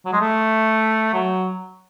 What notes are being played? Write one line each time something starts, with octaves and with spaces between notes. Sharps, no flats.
F#3
G#3
A3
F#3